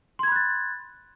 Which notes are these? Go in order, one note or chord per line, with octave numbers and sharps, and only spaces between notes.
B5 C6 F#6 G#6 A6